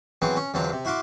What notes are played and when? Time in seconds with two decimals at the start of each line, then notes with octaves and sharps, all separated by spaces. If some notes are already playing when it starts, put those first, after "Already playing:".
0.22 E3 F#3 B3 C4 G#4
0.36 C#4
0.54 E2 D3 F#3 C4 F4
0.72 C3
0.85 E4 F#4 F5 C6 D6